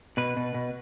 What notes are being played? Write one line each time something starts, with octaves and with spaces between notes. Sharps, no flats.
B2 B4
B2
B2